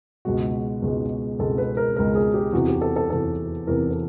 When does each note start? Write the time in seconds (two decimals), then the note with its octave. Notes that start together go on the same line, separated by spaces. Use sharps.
0.25 C#2 B2 G#3 F#4
0.82 C#2 B2 G#3
1.39 C#2 B2 G#3 A4
1.58 B4
1.77 A#4
1.96 C#2 B2 G#3 A#4
2.15 G#4
2.34 G4
2.53 E2 C3 E3 F#4
2.68 G4
2.82 A4
2.96 A4
3.10 E2 C3 E3 A4
3.67 E2 C3 E3 A#4
3.91 A4